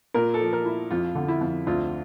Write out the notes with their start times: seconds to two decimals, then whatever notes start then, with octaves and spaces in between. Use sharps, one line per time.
0.14 A#2 A#4
0.34 A4
0.40 F3
0.53 A#4
0.65 E4
0.91 F2 F4
1.15 D3
1.28 E4
1.41 F2
1.67 D2 F4